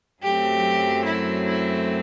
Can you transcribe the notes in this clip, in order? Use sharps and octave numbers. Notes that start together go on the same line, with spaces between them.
F#2 F#3 A3 C4 G4
E4
E4